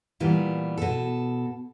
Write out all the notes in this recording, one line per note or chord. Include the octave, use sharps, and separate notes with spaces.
A#2 E3 G3 B3
B2 A4